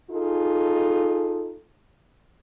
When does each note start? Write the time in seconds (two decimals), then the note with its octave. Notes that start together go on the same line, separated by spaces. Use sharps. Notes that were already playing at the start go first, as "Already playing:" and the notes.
0.11 D#4 F4 G#4 A4